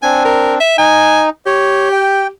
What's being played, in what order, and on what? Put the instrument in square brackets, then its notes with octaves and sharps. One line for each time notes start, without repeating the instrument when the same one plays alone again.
[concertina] C4 D4 [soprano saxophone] G#5
[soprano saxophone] A#4
E5
[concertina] D#4 [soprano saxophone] G#5
[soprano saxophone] G4 [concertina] C#5
[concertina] G5